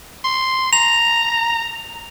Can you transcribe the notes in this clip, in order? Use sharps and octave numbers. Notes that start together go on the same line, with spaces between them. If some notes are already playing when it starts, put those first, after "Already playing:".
C6
A#5 F7